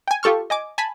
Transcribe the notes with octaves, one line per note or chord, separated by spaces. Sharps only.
G5 G#5
F4 G4 A4 C#6 F6
D#5 G#5 D6
G#5 A5 B5